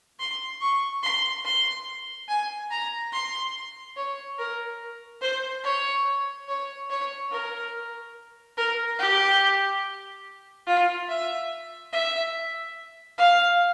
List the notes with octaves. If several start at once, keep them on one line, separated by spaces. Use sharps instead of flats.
C6
C#6
C6
C6
G#5
A#5
C6
C#5
A#4
C5
C#5
C#5
C#5
A#4
A#4
G4
F4
E5
E5
F5